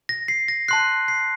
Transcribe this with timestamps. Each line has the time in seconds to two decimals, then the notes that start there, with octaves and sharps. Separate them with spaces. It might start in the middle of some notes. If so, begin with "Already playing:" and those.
0.09 A#6
0.28 C7
0.48 A#6
0.68 A5 C6 F#6 C7
1.08 C7